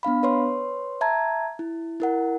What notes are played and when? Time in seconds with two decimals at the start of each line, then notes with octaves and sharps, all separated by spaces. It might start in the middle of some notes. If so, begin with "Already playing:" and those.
0.03 B3 D4 F5 B5
0.23 B4 C#5 C6
1.01 E5 A5 A#5 G#6
1.59 E4
2.00 E4 A#4 F#5